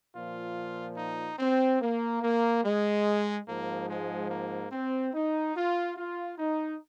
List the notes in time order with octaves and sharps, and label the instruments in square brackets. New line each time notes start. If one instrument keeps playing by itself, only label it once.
[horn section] A#2 F3 F4
D#4
C4
A#3
A#3
G#3
G#2 F3 A#3
G#3
A#3
C4
D#4
F4
F4
D#4